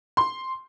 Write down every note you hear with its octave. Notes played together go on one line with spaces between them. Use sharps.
C6